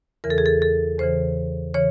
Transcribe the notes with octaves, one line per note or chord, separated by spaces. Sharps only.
E2 C#3 E3 A#4
A4
G#4
A4
A4
E2 C#3 E3 C5
C#3 E3 C#5